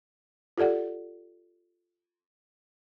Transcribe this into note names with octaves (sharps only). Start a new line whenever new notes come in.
F4 G4 A4 D5 F#5